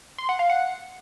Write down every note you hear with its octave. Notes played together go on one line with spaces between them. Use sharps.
C6
F#5
F5
F#5